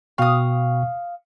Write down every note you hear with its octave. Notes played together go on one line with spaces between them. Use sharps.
B2 F5 G5 C#6 D#6